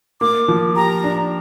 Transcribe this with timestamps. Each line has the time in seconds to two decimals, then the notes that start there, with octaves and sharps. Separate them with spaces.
0.21 A#3 D6
0.48 F3
0.76 G4 A#5
1.04 D4